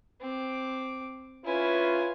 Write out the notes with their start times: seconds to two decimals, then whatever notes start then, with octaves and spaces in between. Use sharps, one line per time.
0.21 C4 D6
1.45 C#4 E4 F4 B4 G#5